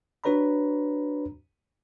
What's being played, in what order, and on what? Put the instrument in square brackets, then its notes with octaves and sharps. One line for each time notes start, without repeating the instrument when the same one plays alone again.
[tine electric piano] D4 F#4 B4 C#5 A#5 B5